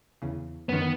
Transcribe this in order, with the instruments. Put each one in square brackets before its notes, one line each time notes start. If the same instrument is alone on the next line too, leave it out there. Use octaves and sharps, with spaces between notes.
[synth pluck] E2 C#3
[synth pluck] F#2 D#3 [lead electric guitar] B3
[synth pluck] D#3